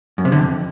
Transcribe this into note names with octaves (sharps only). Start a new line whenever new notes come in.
F#2
C3
D3
F2